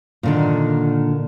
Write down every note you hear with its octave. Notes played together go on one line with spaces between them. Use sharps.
A#2 D3 D#3